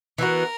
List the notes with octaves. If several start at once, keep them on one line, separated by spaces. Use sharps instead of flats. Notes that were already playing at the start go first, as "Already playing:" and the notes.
E3 B3 F#4 A#4